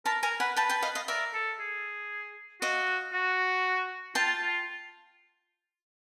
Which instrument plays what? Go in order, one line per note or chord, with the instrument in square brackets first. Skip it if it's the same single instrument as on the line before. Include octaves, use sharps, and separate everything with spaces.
[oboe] A#4 [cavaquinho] A5 B5
[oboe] A#4 [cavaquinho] G#5 A#5
[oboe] B4 [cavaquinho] F#5 G#5
[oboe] B4 [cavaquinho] G5 A5
[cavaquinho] G5 A5
D#5 F5
D#5 F5
[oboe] A#4 [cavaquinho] D5 E5
[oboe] A4
G#4
[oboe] F#4 [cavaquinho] D#5 F5
[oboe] F#4
[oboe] F4 [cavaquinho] G5 A5
[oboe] F4